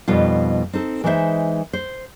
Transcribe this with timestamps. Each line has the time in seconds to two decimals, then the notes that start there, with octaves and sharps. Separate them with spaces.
0.08 F2 B2 G3 D#4 F4
0.73 C4 D#4 A4
1.04 E3 G#3 D#4 C5 E5
1.73 C5